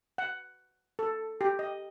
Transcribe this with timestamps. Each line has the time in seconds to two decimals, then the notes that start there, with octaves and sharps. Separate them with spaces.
0.18 F#5
0.99 A4
1.41 G4
1.59 D#5